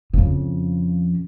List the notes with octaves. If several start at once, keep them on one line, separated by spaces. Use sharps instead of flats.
F2 C#3